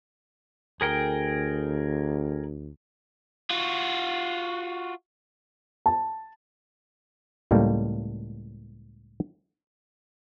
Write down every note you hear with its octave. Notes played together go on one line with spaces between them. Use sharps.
D2 G#4 A#4 G5
F4 F#4
A5
C#2 A2 G3 A#3